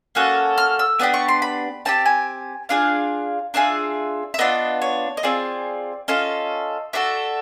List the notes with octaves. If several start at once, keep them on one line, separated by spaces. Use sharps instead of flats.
A#3 C#4 F#4 A4 F#6
F6
E6
B3 D4 G4 D#6
C#6
C6
B5
C4 D#4 G4 A5
G#5
D4 F4 G#4 F5
D4 F4 G#4 E5
E5
B3 D4 F4 D#5
C#5
D#5
C4 F4 G#4 D5
C#4 F4 A4 D#5
D4 F#4 A4 E5